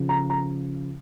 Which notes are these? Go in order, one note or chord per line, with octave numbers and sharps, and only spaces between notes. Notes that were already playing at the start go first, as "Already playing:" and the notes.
Already playing: C#3 F3
A#5
A#5